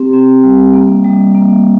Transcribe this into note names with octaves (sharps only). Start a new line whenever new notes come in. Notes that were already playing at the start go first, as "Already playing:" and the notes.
Already playing: C4 G4
C4
G3
A#3
G3
A#3